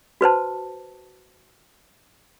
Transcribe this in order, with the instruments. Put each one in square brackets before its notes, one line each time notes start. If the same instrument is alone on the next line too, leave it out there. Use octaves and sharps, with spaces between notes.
[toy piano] F#4 B4 C5 A5